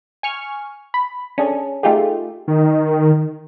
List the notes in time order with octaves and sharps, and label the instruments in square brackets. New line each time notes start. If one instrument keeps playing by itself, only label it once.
[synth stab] G#5 C#6 F6
B5
C#4 D4 G#4 A4
A3 D#4 F4 G4 G#4
[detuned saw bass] D#3